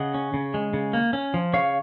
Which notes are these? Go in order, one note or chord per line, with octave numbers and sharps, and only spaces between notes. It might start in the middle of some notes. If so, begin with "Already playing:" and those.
Already playing: C#3 D#5 F#5
C#4
C#3
G#3
C#3
A#3
C#4
F3
C#3 C#5 F5